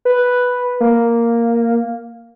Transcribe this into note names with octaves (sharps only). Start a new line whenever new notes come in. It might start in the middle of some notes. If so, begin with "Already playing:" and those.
B4
A#3